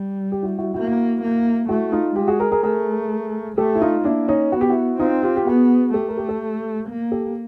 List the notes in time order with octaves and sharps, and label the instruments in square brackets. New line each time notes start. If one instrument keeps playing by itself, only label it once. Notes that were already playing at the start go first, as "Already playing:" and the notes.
Already playing: [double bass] G3
[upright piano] G4
E4 F#4
E4 F#4
[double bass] A#3 [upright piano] E4 F#4
[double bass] A#3
[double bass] A3 [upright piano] E4 F#4
[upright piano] D#4 F4
[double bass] G#3 [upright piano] F4 G4
[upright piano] F#4 G#4
G#4 A#4
G#4 A#4
[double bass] A3 [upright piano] G#4 A#4
[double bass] A3 [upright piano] G4 A4
[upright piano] E4
D#4 F4
[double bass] A#3 [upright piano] D4 E4
[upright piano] C#4 D#4
[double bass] B3 [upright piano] F#4
[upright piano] G4
E4 F#4
[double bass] C4 [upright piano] D#4 F4
[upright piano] F4 G4
G4
[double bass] B3 [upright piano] F#4 G#4
[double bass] A3 [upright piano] G4 A4
[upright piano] A#4
G4 A4
G4 A4
[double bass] A#3
[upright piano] G4 A4